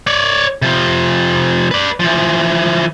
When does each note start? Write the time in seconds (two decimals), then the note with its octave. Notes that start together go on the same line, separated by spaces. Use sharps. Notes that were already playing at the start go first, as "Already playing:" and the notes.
0.07 C#5 D5
0.62 C3 F3
1.71 B4 D5
2.00 E3 F3